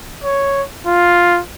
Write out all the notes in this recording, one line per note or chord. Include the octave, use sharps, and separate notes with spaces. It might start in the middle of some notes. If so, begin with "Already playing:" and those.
C#5
F4